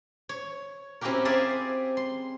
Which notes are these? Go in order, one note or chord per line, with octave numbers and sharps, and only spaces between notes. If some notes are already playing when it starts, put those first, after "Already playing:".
C#5
C4 C#4 E4 F#4 G4 A#4
G#4 C5 D5 E5 F5 A#5
C6